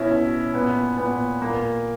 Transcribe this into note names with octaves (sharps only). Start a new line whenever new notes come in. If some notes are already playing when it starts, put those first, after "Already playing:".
Already playing: B2 C#4 E4
B2
A#2 B3
A#2 B3
A#2 A#3